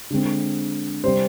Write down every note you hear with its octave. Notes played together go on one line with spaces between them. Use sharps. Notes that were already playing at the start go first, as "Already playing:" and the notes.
D3 G#3 C4
C3 G3 C4 C5